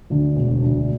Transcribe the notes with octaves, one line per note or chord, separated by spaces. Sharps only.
D2 D3
E1
D2 D3